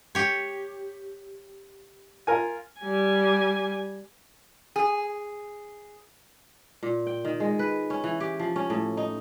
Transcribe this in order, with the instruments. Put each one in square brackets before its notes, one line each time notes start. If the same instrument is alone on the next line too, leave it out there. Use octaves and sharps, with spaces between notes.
[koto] G4 C#5
[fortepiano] F4 A#4 G#5
[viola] G3 G#5
[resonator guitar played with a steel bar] G#4
[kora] A#2
G5
D#3
G#3
B4
C#4
E3
G4
F3
C#4
A2
D#4